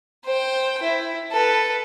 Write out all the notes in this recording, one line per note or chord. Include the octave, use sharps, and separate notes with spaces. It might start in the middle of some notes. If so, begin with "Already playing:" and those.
C5 G5
E4
A4 B4